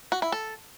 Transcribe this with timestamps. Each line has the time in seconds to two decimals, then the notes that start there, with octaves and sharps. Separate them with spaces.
0.12 F#4
0.22 E4
0.32 A4